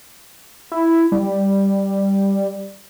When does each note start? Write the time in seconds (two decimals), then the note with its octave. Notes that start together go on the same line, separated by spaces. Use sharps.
0.72 E4
1.12 G3